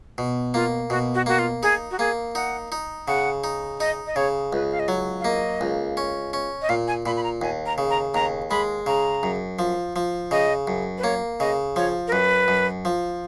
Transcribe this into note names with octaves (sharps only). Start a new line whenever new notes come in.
B2
A#3 F4
B2 F#4
F#4
A#3 F#4
F4
D#4 G#4
F#4
A#3 G#4
D#4 F#5
D#4
C#3 F#5
D#4
D#4 D#5
D#5
C#3 C#5
C#2 B4
F5
D#5
F#3 C#5
F5
A#3 D#5
C#2
C#4
C#4
D#5
A#2 F5
G#5
A#2 B5
B5
A#5
D#2 G#5
A#5
C#3
A#5
D#2 A#5
G#3 B5
C#3 A#5
F#2
F3
F3
C#3 D#5
F#2
B4
A#3 C#5
C#3 D#5
F3 C#5
A#4
F#2 B4
F#2
F3